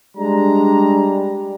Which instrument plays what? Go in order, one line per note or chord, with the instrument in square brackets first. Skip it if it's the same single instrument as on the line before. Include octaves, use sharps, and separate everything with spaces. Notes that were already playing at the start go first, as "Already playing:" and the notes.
[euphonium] G3 [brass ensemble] G#3 D4 A#5